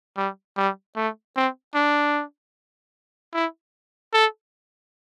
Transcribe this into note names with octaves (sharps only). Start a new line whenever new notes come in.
G3
G3
A3
C4
D4
E4
A4